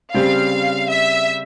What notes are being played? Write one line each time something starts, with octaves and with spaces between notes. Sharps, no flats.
C#3 G3 C4 G4 F5
E5